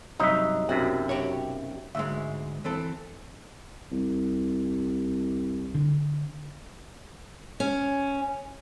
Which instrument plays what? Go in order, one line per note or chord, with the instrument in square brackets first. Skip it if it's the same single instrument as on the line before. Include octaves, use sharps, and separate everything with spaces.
[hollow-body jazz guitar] G2 C3 F#3 [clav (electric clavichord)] D#4 E5
[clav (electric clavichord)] B1 F#2 C3 [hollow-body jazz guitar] F#4
[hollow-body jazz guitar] F#4 G4 C#5
[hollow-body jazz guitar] D2 G#2 G#3 [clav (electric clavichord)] E5
[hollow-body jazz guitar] E3 C4 A4
[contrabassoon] C2
[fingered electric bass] D3
[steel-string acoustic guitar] C#4